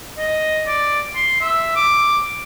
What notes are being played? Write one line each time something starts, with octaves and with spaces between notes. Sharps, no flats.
D#5
D5
C6
E5
D6